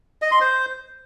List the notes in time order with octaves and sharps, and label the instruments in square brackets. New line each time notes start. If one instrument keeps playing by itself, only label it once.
[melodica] D#5
C6
C5